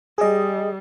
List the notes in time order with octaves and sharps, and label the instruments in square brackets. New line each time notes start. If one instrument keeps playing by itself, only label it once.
[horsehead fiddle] G3 [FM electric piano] G#4 D#5